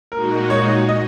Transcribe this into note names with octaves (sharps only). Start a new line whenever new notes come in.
A#2 G#3 D#4 F#4 A#4
C#5
D#5